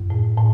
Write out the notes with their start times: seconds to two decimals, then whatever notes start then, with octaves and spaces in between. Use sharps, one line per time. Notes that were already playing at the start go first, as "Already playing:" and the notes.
Already playing: F#2
0.10 A2
0.38 A2